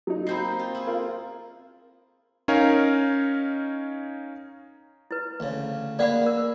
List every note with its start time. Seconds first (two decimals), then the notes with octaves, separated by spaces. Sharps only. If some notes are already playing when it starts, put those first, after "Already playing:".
0.07 F#3 D#4
0.27 A#3 C4 D#4 B5 G6 C7
0.59 F4
0.75 E4 G#4
0.87 F4 A#4
2.48 C#4 D#4 A#4 C#5 F5
5.11 E4 B4
5.40 D2 C#3
5.99 A#3 G#4 B4 D5 F#5 B5
6.26 A#4